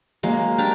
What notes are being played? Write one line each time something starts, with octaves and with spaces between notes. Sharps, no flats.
F#3 G#3 A#3
D4 G4 A#4